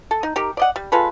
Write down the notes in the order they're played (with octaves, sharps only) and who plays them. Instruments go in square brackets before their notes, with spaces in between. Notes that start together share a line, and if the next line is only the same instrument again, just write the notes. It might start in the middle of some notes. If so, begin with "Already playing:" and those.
[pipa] A4
D#4
D#4 G4 A#4
D5 D#5 F#5
G3
G#3 F4 A4 B4